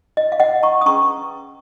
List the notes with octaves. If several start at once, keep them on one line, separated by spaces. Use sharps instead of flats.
D#5
F5
D#5 F#5
A#5 C#6
D#6
C#4 G#4 B4 A#5 C#6